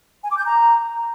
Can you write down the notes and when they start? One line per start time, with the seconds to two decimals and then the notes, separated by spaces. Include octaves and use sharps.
0.23 G#5
0.30 D6
0.38 G6
0.45 A#5